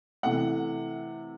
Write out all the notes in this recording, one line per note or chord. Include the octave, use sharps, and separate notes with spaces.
C3 E3 A3 F#5